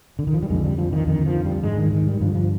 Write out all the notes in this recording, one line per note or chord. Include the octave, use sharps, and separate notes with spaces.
D3
D#3
F3
G3
F2 D3 G#3
G3
F3
D#3
F2 D3 D#3
F3
G3
G#2 G#3
D#3
D#3
G3
G2 D3 F3
F3